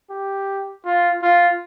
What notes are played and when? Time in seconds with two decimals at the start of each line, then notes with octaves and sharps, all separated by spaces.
0.10 G4
0.85 F4
1.22 F4